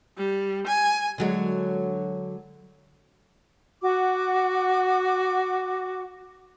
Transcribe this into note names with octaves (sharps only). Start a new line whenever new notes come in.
G3
G#5
D3 F#3 G#3
F#4 F#5 D6